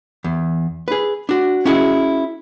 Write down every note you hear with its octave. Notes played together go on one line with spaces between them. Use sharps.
E2
G#4 B4
D4 F#4
C#4 E4 F#4 G#4 D#5